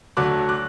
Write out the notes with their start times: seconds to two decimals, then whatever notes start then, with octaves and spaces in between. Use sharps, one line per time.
0.17 D2 D3 F#3 A3 D6 F#6
0.49 D6 F#6